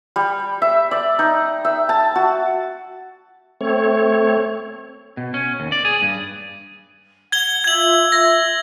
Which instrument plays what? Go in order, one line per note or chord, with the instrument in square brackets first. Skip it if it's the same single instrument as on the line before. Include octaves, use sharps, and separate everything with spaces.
[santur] G3
E5
D5
D#4
E5
A5
F#4
[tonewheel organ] A3 C4 C#5
[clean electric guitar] B2
C#4
D#2
D5
G#4
G2
[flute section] F#5 [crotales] G#6 G7
[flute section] F4 E5 E6 [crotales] G#6 F#7
[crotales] A#6